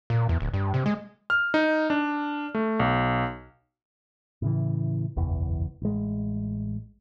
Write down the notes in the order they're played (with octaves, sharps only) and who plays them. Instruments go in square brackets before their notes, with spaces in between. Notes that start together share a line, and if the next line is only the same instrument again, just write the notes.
[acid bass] A#2
E2
D1
G2
C3
G#3
[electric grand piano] F6
D#4
D4
A3
B1
[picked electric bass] A2 C#3 E3
F#1 B1 E2 E3
A1 G#3